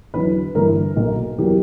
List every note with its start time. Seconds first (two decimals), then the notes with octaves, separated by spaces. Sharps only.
0.14 E2 D3 F#3 B4
0.55 G1 G2 E3 A#3 A#4
0.96 B1 A#2 A#3
1.37 E2 B2 F#3 A#3 G4